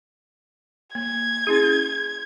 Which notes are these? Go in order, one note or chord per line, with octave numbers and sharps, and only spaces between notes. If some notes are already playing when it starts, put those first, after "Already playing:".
A#3 G#6
C#4 E4 G#4